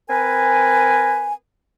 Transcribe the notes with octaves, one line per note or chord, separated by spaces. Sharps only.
C4 A#4 B4 G#5